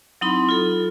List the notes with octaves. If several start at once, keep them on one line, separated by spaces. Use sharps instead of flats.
F#3 C4 D#4 E4 B5 C6
F4 A4